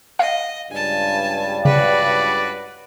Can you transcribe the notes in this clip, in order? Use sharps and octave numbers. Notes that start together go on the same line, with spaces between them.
D#5 F5
C#2 G2 G#5 A5
C#3 F#4 B4 D5